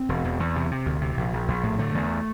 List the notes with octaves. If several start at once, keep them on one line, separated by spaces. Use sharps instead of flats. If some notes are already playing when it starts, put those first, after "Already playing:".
Already playing: C4
E1
E2
E2
C3
C3
D2
C3
A#1
A#1
A#1
A2
D3 A3
E2